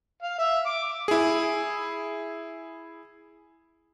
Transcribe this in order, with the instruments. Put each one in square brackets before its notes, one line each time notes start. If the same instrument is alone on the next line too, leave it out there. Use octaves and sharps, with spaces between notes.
[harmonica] F5
E5
D6
[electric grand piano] E4 G#4